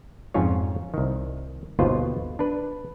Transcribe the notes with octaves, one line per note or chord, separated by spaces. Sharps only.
F2 G#2 C#4 F4 C#5
C2 D#3
G1 D#2 B2 F4 B4 C5
D4 B4